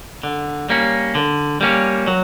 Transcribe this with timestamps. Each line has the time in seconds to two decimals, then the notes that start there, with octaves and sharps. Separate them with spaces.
0.23 D3
0.69 G3 A#3 C#4
1.15 D3
1.61 G3 A#3 C#4
2.07 F#3